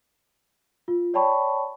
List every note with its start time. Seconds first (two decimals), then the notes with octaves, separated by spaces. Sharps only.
0.88 F4
1.14 C#5 D5 G5 A5 B5 C#6